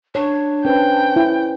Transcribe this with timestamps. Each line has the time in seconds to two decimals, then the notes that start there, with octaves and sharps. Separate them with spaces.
0.15 D4 C#5
0.65 C#4 B4 C5 G5
1.16 E4